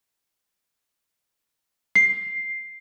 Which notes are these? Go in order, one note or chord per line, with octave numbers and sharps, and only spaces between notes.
C7